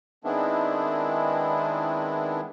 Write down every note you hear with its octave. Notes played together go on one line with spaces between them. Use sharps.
D#3 G#3 B3 C4 D4 E4